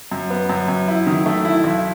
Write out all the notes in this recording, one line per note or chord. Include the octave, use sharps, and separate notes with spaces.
F#2
B3
F#2
F#2
E4
D#3
A3
E4
B1